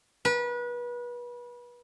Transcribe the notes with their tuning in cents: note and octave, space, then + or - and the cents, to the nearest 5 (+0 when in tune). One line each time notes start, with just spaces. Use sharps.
B4 -30